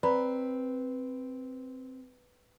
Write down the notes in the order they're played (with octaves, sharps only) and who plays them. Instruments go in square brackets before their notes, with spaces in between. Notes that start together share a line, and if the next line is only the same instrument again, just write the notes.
[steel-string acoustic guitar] C4 [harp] B4 [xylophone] D5 A#5 B5